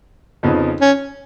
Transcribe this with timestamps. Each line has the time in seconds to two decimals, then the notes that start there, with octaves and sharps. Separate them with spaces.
0.43 F2 C#3 F3 B3 D#4
0.81 C#4